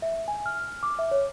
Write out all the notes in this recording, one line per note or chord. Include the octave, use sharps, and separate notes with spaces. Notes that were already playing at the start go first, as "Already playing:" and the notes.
E5
G#5
F6
D6
E5
C#5